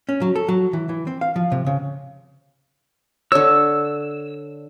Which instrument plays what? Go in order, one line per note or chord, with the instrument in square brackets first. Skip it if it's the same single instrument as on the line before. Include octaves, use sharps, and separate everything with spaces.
[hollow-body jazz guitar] C#4
F#3
A4
F#3
E3
E3
C4
F5
F3
C3
C#3
[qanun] D3 C#5 [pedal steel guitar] E6